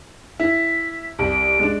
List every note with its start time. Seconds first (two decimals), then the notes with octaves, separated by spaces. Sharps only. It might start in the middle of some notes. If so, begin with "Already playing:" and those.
0.40 E4 B6
1.19 C2 D7
1.59 G#3 D4